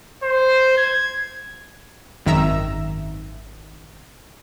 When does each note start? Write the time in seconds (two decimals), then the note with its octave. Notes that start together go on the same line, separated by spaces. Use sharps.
0.23 C5
0.77 G#6
2.26 G#1 F#2 D#3 E5 A#5 E6